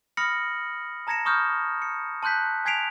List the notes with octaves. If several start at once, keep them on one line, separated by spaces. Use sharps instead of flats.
B5 D#6 F6 A#6 C#7 F#7
A5 A#5 G#6 A#6 C#7 E7
B5 C#6 D#6 F6 G6
C#7
A5 C6 F#6 G6 B6
G#5 G#6 B6 C7 D7 F7